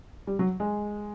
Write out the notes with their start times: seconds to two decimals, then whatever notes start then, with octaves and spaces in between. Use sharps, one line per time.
0.27 G3
0.39 F#3
0.60 G#3